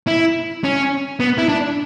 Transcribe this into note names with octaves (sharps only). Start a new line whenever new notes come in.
E4
C#4
B3
E4
D4